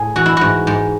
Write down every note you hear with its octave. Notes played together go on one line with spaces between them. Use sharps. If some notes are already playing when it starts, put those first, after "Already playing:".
Already playing: A2 G#4
E3 F#4
E4
G#2 F#4
G#2